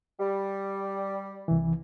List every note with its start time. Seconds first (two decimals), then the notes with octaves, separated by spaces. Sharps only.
0.19 G3
1.48 C2 E3